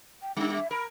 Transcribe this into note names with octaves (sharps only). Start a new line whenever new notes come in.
G5
G3 D4 D#4
E5
A#4 B5